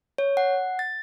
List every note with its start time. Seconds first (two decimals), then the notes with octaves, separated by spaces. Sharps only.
0.18 C#5
0.37 F#5
0.79 A6